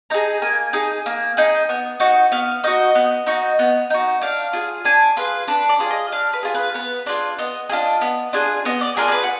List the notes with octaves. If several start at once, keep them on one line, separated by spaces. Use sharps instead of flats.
D#4 G#4 A#5
A#3 G#5
D#4 G#4
A#3
D#4 G#4
B3
D#4 F#4
B3 F5
D#4 F#4 D#5
B3
D#4 F#4
B3
D#4 F#4
D4 F5
F4 G#4
D4 G#5
F4 G#4 B4
D4 B4
D5
F4 G#4
D#5
D4 F5
B4
F4 G#4
B4
B3 B4
D4 F4 G#4 D5
B3 D#5
D4 F4 G#4
B3
D4 F4 G#4
B3 D#5
D5
D4 F4 G#4 A#4
D5
B4
F#5